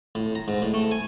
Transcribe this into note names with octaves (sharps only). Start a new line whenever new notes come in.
A2
A#5
G#2
A2
A3
G#5